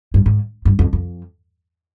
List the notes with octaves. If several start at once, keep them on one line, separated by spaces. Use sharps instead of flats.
G2
G#2
G2
F2
F2